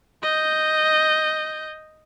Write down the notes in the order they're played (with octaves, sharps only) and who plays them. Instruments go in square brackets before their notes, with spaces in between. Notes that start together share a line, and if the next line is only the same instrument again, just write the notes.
[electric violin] D#5 G6